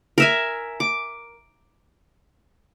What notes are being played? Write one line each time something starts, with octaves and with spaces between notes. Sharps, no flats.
A#4 E5 G#5
D6